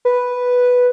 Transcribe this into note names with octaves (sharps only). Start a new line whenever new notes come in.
B4